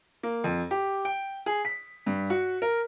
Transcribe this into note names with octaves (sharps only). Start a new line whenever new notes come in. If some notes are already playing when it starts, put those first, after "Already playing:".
A#3
F2
G4
G5
G#4
B6
G2
F#4
A#4